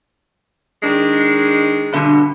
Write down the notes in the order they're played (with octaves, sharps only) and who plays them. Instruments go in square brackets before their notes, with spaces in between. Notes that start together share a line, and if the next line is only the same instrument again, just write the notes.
[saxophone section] D#3 G#3 D4
[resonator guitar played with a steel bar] G2 B2 D3